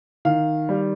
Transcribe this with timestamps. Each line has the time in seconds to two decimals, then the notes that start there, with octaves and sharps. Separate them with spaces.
0.25 D#3 F5
0.69 G3